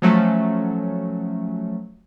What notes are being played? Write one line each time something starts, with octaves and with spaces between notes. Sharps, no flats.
F3 F#3 A3 C#4